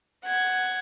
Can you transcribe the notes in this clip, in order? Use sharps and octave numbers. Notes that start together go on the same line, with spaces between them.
F#5 G#6